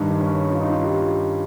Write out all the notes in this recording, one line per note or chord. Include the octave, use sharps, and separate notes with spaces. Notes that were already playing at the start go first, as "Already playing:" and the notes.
Already playing: G2 D#3
C#4
F4
D#4
F4
G4